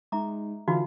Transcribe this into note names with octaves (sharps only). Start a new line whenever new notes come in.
G#3 D#4 E5 A#5 D6
D3 E3 D#4 F4 F#4 F5